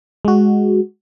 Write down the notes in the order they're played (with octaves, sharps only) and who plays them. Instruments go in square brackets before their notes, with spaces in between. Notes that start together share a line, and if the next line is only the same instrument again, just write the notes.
[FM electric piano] G#3 F#4